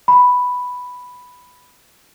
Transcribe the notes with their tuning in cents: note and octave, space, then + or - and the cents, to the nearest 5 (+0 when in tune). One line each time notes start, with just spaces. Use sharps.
B5 +0